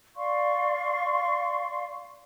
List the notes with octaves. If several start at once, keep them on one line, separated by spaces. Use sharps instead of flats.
D5 F5 C6 C#6